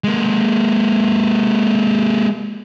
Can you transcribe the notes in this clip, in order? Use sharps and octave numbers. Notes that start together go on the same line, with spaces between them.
G#3 A#3